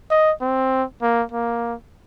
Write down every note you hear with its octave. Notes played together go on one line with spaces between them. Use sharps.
D#5
C4
A#3
A#3